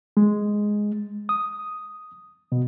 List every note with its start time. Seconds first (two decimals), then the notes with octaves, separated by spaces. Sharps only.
0.17 G#3
1.29 D#6
2.52 B2